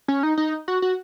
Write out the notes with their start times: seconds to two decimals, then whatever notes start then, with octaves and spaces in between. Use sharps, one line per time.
0.08 C#4
0.23 D#4
0.37 D#4
0.68 F#4
0.82 F#4